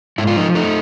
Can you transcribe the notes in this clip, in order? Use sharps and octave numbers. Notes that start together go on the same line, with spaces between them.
G#2 E4
F4
F3 D#4
A3 D#4